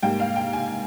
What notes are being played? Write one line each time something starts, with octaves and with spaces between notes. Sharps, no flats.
G#2 G3 A#3 G5
F5
G5
G#5